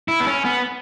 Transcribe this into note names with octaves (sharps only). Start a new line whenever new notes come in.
E4
B3
C#4
B3